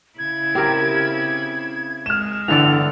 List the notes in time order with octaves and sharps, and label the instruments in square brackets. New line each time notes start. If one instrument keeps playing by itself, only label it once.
[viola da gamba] C#3 E4 [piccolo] G#6
[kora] C4 G4 A#4
[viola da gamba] G#3 [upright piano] F6 E7
[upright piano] G1 D3 [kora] E3 A4 D5 [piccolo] F7